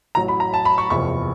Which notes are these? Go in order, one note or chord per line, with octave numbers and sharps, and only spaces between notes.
A1 A2 F#3 A#5
B5
A#5
A5
B5
C#6
F#1 E2 C3 F3 C#6